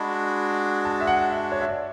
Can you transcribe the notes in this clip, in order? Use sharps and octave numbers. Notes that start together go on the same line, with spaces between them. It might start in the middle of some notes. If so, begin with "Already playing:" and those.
Already playing: G#3 D4 F#4 B5
A5
E5
F#5
E5
C#5
E5
D5